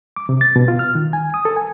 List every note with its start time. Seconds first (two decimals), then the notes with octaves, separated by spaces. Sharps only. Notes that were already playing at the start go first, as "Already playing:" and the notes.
0.16 D6
0.29 C3
0.41 A6
0.56 B2
0.68 F4
0.79 F6
0.95 D#3
1.13 G#5
1.34 D#6
1.45 A4
1.56 G#5